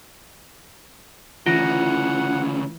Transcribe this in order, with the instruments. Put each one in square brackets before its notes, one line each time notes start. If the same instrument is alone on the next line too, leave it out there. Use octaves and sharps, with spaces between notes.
[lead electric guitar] D2 C#3 [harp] E3 [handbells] F4 [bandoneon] F#5